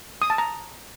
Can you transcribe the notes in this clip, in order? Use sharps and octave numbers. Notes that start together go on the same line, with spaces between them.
D#6
A5
A#5